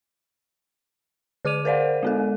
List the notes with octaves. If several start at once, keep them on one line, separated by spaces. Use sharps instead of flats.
D3 G#4 D6 D#7 F7
A#4 C5 D5 F5 F#5
G#3 B3 A4